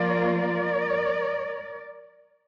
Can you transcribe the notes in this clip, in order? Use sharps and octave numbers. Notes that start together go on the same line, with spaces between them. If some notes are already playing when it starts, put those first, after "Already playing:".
Already playing: F3 A#3 F4 A#4 D5
A#4 D5